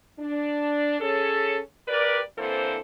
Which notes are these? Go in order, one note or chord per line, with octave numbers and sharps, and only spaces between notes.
D4
C#4 G#4 A4
G4 A#4 B4 D5
D3 E3 A#3 C4 A4 C5